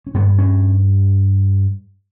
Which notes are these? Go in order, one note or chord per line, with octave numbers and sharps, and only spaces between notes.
C#4
G2 B3
C#4